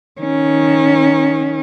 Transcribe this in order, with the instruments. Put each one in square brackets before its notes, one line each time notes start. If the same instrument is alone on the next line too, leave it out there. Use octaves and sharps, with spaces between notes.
[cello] D#3 C#4